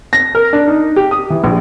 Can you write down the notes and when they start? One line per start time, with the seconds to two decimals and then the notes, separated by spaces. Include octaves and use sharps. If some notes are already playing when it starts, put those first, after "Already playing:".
0.13 A#6
0.35 A#4
0.53 D4
0.68 D#4
0.96 G4
1.11 D#6
1.30 E3
1.44 A#1